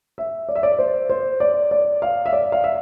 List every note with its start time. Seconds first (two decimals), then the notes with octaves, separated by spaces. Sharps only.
0.18 E5
0.49 D5
0.55 E5
0.63 D5
0.79 C5
1.09 C5
1.40 D5
1.71 D5
2.02 F5
2.26 E5
2.33 D5
2.52 F5
2.64 E5